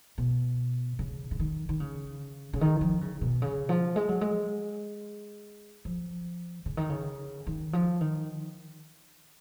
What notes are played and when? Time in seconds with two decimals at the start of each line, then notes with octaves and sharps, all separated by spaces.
0.18 B2
0.99 C#3
1.31 C#3
1.40 D#3
1.69 D#3
1.80 C#3
2.54 C#3
2.61 D#3
2.81 F3
3.01 C#3
3.21 B2
3.42 C#3
3.69 F3
3.96 G#3
4.08 F#3
4.21 G#3
5.85 F3
6.66 C#3
6.77 D#3
6.90 C#3
7.47 D#3
7.73 F3
8.01 D#3